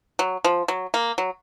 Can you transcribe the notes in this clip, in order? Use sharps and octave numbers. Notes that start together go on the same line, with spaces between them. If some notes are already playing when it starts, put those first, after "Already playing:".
F#3
F3
F#3
A#3
F#3